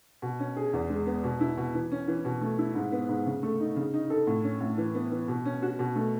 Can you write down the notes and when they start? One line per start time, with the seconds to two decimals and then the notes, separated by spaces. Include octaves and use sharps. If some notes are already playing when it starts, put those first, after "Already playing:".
0.22 B2
0.39 C#4
0.56 G#4
0.73 E2
0.90 G#3
1.06 B3
1.24 B2
1.41 E4
1.57 B2
1.75 E3
1.91 C#4
2.08 E3
2.25 B2
2.41 A3
2.59 E4
2.75 G#2
2.92 B3
3.09 G#2
3.26 C#3
3.43 A3
3.60 D#4
3.76 C#3
3.94 D#4
4.10 A4
4.27 A2
4.44 C#4
4.61 A2
4.78 E3
4.95 B3
5.12 E3
5.28 B2
5.45 C#4
5.62 F#4
5.79 B2
5.96 A3